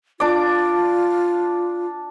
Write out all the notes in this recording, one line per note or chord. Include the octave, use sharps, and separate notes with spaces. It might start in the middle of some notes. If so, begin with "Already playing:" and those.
D4 F4 D6